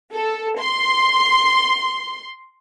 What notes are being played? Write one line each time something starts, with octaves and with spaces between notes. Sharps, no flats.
A4
C6